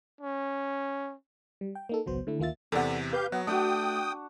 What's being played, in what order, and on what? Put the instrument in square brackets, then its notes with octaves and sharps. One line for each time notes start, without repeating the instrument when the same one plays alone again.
[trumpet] C#4
[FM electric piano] G3
G5
A#3 D#4 A4
G#1 C#2 F#3 B3 C5
D3 A3 E4
D#2 A#3 F4 E5 A6
[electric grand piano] E2 C3 [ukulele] A4 D5 F#5
[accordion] G4 F5 G6 [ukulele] B4
[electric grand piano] F#3 [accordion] B3 [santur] F#5
[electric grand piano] A3 [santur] D4 F#4 [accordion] G5 D#6